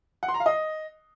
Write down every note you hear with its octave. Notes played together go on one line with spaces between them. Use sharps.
F#5
C6
A#5
F5
D#5